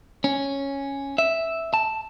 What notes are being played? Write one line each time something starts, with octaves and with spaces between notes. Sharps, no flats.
C#4
E5
A5